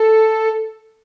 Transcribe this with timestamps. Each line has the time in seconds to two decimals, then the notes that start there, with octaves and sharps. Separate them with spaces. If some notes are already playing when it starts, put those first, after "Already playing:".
Already playing: A4